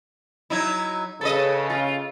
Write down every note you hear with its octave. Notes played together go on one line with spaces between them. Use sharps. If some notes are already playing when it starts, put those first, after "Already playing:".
F#3 D#4 E4
C#3 A4 B4 D#5
F4